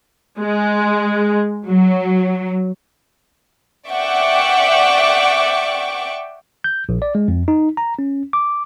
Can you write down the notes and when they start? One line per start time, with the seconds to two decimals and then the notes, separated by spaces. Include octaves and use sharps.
0.39 G#3
1.67 F#3
3.90 D5 E5 F#5 G5 C#6 D6
6.64 G6
6.89 A#1
7.02 D5
7.15 G#3
7.28 F2
7.48 D#4
7.77 A#5
7.99 C#4
8.33 D6